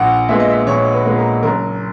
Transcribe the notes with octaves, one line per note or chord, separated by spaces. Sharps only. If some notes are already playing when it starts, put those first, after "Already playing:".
Already playing: A#1 F#5
A#2 G#3 B3 E5
D#5
E5
A#1 C#5
B4
A#2 G#3 B3
A#4
F#1 A#4